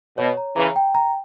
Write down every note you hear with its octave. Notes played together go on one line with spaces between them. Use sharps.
B2 C#5
A#5
C#3 E3 A#5
G5
A#5